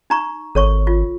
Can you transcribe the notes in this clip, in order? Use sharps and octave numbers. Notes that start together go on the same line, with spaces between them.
D#4 A#5 C#6
G#1 A4 C#5 C#6
F4